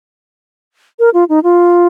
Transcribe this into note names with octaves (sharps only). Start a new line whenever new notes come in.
A#4
F4
D#4
F4